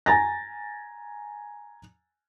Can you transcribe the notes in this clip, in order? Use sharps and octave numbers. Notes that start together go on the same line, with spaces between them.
G#5 A#5 A6 A#6